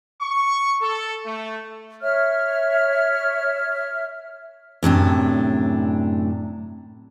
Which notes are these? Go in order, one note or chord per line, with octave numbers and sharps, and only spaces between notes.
C#6
A4
A3
C#5 E5 F6
F#2 A2 C3 D4